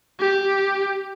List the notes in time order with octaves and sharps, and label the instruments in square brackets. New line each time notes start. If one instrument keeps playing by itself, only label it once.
[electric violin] G4